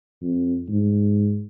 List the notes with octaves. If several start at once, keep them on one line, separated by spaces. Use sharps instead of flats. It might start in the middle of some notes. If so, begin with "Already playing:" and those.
F2
G#2